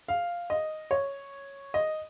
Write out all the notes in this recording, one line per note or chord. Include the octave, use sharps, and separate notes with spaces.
F5
D#5
C#5
D#5